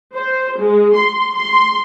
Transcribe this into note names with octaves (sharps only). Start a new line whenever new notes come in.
C5
G#3
C6
C6